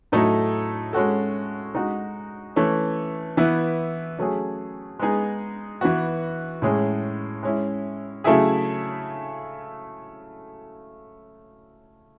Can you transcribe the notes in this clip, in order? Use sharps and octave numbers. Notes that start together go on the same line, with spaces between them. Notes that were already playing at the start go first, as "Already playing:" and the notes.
A2 F#3 A3 D#4 A4
G#3 C#4 F#4 A4
G#3 D#4 F#4
E3 A3 C#4
E3 B3 E4
F#3 A3 C#4 G#4
G#3 B3 D#4 G#4
E3 B3 F#4
A2 G#3 C#4 G#4
G#3 C#4 E4
C#3 F#3 A3 E4 G#4